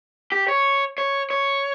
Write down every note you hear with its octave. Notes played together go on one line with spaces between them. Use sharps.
G4
C#5
C#5
C#5